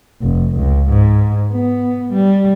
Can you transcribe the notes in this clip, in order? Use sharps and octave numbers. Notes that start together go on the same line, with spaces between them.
F1
C#2
G#2
B3
G3